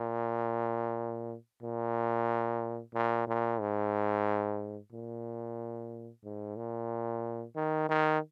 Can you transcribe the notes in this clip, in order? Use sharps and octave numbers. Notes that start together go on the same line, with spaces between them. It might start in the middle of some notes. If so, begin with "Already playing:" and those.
Already playing: A#2
A#2
A#2
A#2
G#2
A#2
G#2
A#2
D#3
D#3